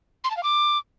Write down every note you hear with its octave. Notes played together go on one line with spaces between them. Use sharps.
C6
A5
F5
D6